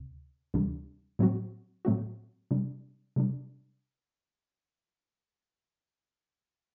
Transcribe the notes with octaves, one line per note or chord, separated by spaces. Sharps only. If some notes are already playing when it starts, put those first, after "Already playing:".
Already playing: D2 C3
D2 C3 E3 G3 D4
A2 F#3 A3 C4 F#4
A2 F#3 A3 C4 F#4
C3 G3 D4
C3 G3 D4